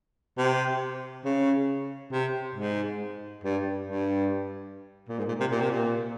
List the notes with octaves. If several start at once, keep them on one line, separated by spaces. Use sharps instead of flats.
C3
C#3
C3
G#2
G2
G2
A#2
G#2
A#2
C3
A#2
C3
A#2